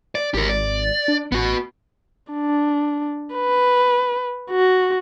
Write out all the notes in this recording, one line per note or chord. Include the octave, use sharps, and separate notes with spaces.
D5
G#1 G4 A#4
D5
D4
A1 B3 F#4
D4
B4
F#4